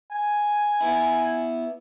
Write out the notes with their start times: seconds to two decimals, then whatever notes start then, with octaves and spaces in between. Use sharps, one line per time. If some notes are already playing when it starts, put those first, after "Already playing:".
0.11 G#5
0.81 B3 E4